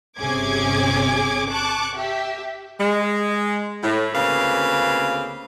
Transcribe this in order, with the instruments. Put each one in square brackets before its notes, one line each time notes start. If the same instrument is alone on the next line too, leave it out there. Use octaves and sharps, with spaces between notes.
[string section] G1 C3 C#4 G#4 D6 G#6
A5 C#6 D6 F#6
G4 E5
[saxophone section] G#3
A2
D2 C#3 A#3 C4 B4 F5